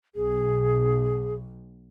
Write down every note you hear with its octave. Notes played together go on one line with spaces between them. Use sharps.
B1 G#4